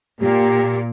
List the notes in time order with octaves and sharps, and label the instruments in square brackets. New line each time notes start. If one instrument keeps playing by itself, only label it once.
[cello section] A#2 A#3 [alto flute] G4